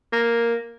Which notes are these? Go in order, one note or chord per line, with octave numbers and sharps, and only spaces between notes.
A#3